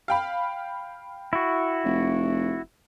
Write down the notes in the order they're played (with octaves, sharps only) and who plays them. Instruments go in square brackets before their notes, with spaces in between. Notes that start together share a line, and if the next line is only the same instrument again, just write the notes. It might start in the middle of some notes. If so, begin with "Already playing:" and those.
[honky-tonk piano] F5 G5 B5
[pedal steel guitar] E4 F#4
[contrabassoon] F1